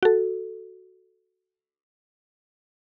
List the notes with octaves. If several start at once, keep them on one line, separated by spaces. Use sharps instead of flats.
F#4 A4